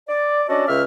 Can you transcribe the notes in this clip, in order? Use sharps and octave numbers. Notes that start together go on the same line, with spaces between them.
D5
C#4 D4 F#4 A4 D5 D#5
C#2 E5 F6